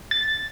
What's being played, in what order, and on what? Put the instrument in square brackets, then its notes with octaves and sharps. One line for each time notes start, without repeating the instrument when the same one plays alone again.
[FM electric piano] A6